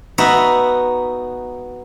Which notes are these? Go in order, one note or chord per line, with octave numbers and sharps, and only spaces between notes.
B3 D#4 F#4 E5